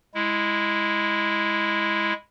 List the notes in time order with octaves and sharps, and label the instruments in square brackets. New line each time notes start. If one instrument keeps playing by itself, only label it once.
[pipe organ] G#3 E4